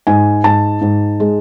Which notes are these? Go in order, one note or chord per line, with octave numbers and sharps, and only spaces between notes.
G#2 G#5
G#2 A5
G#2
G#3